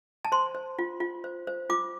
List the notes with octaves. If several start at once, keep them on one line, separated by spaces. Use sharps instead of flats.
A5
C5 C6
C5
F4
F4
C5
C5
F4 D6